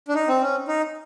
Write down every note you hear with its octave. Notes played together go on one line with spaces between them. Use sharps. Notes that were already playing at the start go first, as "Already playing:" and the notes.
D4
D#4
C4
C#4
D#4